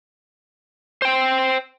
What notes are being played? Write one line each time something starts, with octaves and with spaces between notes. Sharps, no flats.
C5 G5